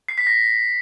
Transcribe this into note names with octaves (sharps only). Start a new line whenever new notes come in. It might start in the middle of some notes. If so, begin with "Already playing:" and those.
C7
B6
A#6